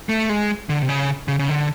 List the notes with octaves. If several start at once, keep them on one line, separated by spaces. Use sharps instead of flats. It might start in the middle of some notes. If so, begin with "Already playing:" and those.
A3
G#3
D3
C3
C#3
C#3
C#3
D3